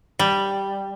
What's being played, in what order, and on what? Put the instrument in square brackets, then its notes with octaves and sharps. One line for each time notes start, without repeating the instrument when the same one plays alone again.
[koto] G3